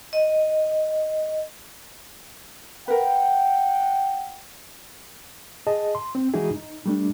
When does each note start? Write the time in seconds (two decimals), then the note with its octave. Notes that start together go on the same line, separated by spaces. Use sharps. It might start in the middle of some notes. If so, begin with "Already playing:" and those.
0.13 D#5
2.88 A#4 B4 F#5 G5
5.67 G#4 D#5 A5
5.95 C6
6.15 C4
6.34 E3 G#3 D#4 E4 F#4 G#4
6.56 D#4
6.86 G3 A3 D4